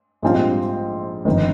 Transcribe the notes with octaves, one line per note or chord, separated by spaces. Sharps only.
A#1 G#2 G3 C4 F4
G1 F2 D#3